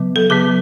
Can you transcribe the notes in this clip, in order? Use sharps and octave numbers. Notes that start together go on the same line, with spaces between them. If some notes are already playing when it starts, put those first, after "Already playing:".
Already playing: C#3 F#3 B3
A4
C#3 F#3 B3 G#4